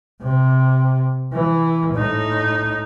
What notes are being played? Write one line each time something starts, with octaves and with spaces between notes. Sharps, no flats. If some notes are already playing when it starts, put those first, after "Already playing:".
C3
E3
A2 D#4